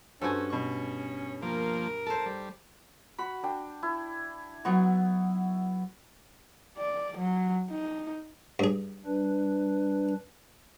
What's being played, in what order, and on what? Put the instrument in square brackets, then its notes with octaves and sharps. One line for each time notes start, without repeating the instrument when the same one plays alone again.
[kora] G2 F#4 [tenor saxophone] C#4 [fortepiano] A4 C5 G#5
[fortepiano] B2 C#6
[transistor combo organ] F3 A#3 [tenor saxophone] A#4
[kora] A4 C5 [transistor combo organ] A5
[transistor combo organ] G3
[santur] F#4 [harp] B5
[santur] D4 G5
E4
[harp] F#3 D#4 [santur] B3 C#6
[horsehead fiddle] D5
F#3
D#4
[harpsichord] G2 G#4
[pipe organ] G3 D4 B4